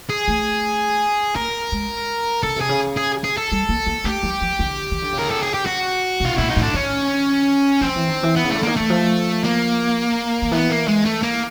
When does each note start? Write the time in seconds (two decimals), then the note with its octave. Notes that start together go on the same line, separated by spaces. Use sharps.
0.09 G#4
0.28 A3
1.36 A#3 A#4
1.72 G#3
2.43 C#3 A4
2.56 C3 G#4
2.69 C#3
2.97 G#4
3.24 G#4
3.37 A4
3.52 G3
3.69 A#3
3.87 A#3
4.04 A3 G4
4.23 F#3
4.41 F3
4.59 D3
4.91 D#3
5.02 D3
5.13 C#3
5.18 A#4
5.30 A4
5.43 G#4
5.54 G4
5.66 F#4
6.20 B2 F4
6.37 A#2 E4
6.50 D#4
6.56 A2
6.63 D4
6.74 D#3 C#4
7.81 F3 C4
7.96 E3
8.09 D#3
8.23 E3
8.36 B3
8.44 C#3
8.50 A3
8.55 D3
8.63 D#3 A#3
8.76 E3 A3
8.90 F3
9.44 A#3
10.42 D#3
10.51 E3 B3
10.70 A#3
10.88 G#3
11.05 A3
11.23 A#3